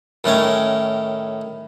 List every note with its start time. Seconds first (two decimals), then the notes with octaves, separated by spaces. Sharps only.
0.24 A2 D#3 C#4 G#5